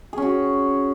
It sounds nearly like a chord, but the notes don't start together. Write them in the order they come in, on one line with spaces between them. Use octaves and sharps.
G#4 C#4 F#4